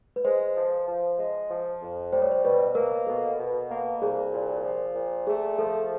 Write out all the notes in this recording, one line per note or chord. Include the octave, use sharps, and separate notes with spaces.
B4
G#3 C5
F3
F3
G#3
F3
F2
G3 C5
C#5
C5
B2 B4
A#3 A#4
B2 A4
B2
A#3
C2 G#4
A#2
F3
A#2
A3 G#4
F3 A4